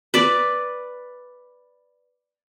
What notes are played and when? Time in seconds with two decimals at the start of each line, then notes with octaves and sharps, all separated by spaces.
0.14 B4 D5